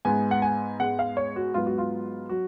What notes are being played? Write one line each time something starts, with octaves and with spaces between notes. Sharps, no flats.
G#2 G#3 B3 G#5
F#5
G#5
G#2 G#3 B3 F#5
F5
C#5
F#4
G#2 F#3 B3 F4
F#4
F4
F#3 F#4